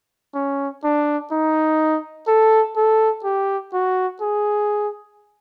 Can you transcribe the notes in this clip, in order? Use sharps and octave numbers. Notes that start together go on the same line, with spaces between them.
C#4
D4
D#4
A4
A4
G4
F#4
G#4